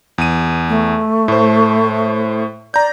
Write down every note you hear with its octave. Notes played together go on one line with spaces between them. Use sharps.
E2 D#7
A3
A2 C5
D5 A#5 G6